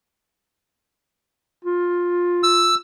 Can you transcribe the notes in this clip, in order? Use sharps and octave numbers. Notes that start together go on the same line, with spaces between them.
F4
E6